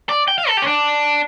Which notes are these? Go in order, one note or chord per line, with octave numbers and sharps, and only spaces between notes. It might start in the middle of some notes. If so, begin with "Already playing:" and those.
D5
G5
F5
A4
G4
C#4
D4